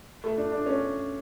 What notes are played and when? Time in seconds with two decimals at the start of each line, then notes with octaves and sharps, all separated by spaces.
0.24 A3
0.38 D4
0.52 D4
0.66 C#4